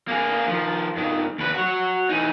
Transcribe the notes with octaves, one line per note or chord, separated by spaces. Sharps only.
A#3 G#4
D#3 F3
G2 D#3
D#2 B4
F#4 C#5
E3 D#4